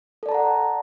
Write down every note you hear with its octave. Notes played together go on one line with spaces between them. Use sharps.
A4 D5 F#5 A5 A#5